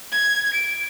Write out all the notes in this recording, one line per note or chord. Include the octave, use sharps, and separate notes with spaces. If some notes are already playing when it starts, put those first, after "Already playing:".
G#6
D7